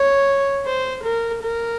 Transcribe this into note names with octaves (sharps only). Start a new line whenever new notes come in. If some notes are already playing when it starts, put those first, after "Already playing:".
Already playing: C#5
C5
A#4
A#4